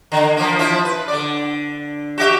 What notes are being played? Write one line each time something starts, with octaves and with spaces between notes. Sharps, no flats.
D3
F3 A#3
F3 E4
B4
D3 D5
F#4 G4 E5